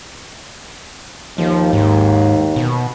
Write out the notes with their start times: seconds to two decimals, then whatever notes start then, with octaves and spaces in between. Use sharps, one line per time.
1.38 D#2 F3
1.73 G#2
2.56 B2